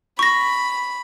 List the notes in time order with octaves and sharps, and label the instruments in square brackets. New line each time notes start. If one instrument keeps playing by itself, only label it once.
[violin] B5 [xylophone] C#6 A#6